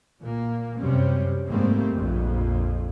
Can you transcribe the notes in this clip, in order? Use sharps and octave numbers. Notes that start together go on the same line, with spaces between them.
A#2 A#3
F#2 C3 G3 C4 C#4
G#2 G3 A3 A#3 C4
A#1 F2